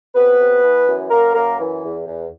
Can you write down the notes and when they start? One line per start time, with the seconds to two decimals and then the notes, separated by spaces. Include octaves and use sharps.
0.15 C3 B3 B4
0.39 C3
0.63 E3
0.87 F#2
1.11 F#2 A#3 A#4
1.34 F#2 A#3 A#4
1.59 E3
1.83 E2
2.07 E2